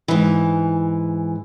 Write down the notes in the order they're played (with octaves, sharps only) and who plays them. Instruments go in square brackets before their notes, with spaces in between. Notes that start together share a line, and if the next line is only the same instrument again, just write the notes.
[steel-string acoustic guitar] G#2 E3